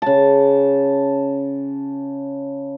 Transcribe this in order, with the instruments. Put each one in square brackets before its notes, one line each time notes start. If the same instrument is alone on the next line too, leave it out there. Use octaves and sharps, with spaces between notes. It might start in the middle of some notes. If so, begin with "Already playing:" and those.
[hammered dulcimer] C#3 A5